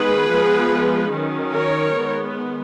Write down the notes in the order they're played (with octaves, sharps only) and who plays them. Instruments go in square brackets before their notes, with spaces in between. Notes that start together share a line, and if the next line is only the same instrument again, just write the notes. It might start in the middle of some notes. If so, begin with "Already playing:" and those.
Already playing: [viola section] D#3 G#3 B3 G#4 B4
F3 G#3 B3
D#3 F#3 C#4
A#4 C#5
D#3 G#3 B3